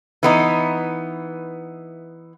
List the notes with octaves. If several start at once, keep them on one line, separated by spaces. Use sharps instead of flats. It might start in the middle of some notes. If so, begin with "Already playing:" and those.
E3 B3 D#4